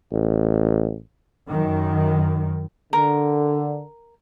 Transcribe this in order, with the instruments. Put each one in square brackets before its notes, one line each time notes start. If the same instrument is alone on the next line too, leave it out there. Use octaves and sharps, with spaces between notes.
[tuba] A1
[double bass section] F#2 D#3
[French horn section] D3 [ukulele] A#4